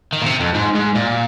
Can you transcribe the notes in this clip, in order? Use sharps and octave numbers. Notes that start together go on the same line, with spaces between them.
D#3
A#2
C3
F2
G#2
G#2
A#2